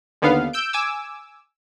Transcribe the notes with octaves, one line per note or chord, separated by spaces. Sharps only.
D#2 D3 B3 F5
E6 G6 D7
G#5 D6 E6